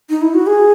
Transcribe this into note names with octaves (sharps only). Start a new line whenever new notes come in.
D#4
E4
F#4
G#4